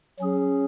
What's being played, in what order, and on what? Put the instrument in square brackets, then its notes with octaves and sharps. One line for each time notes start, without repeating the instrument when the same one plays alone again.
[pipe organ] F#3 C#4 G#4